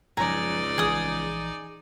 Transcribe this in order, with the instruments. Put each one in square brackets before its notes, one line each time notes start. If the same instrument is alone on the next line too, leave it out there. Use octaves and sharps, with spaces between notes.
[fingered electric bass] F#1 A2 F3 [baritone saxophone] C#2 [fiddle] D#4 D5 [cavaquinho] G#5 A#5
[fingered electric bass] A#1 E3 [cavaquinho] G#4 D#6